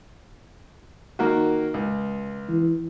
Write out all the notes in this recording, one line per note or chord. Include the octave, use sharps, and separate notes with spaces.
D#3 A#3 F#4
C#2
E3